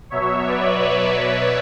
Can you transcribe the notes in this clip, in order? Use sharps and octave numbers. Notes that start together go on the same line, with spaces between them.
B2 F#3 C#5 E5
B4 D5
C#5 E5
B4 D5